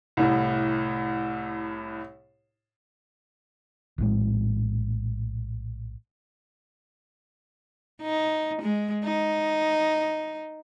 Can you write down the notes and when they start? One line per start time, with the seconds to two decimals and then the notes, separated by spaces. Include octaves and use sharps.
0.17 C2 A2
3.98 A#1 A2 G#3
8.02 D#4
8.62 G#3
9.04 D#4